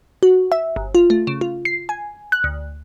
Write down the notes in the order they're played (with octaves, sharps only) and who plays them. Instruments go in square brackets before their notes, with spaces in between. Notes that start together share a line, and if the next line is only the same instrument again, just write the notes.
[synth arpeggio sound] F#4
E5
G1
F4
A3
C#3
F4
C7
G#5
F#6
D2